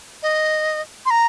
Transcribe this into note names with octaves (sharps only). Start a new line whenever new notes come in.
D#5
C6
A#5